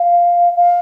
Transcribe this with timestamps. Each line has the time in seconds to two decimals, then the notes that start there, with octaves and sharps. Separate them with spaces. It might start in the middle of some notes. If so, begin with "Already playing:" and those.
Already playing: F5
0.57 F5